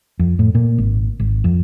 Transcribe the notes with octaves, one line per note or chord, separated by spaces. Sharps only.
F2
A2
A#2
G#1
G#1
F2